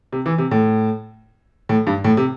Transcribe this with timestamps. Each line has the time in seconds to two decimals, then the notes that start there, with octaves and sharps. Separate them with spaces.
0.13 C3
0.26 E3
0.38 C3
0.51 A2
1.69 A2
1.87 G2
2.04 A2
2.17 C3